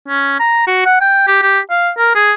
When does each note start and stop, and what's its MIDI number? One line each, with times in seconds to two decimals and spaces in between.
0.08 0.37 61
0.40 0.63 82
0.67 0.83 66
0.85 0.97 78
1.01 1.24 79
1.27 1.41 67
1.42 1.60 67
1.71 1.91 77
1.98 2.12 70
2.15 2.33 68